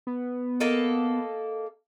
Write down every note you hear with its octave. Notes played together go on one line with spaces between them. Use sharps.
B3
A#3 A4 D#5